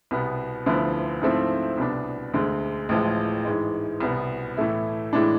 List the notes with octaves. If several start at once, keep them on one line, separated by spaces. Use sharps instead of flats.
C2 B2 B3
D2 D3 F3 B3 E4
G#2 F3 A3 C4 E4
C2 B2 B3 D4
D2 D3 G#3
A1 A2 F3 G#3
G#2 E3 G#3
C2 B2 B3
A2 E3 A3 E4
A2 E3 G#3 D4